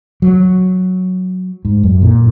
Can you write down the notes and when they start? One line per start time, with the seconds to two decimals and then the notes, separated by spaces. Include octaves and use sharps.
0.22 F#3
1.65 G#2
1.83 F#2
2.02 A#2